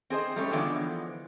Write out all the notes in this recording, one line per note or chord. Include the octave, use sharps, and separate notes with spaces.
C4 G#4 C5 D#5
G3 A3 C#4 C#5
D3 E3 F3 G#3 B3